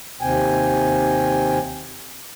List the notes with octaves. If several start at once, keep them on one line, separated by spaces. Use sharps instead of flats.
D#2 C3 G5 G#5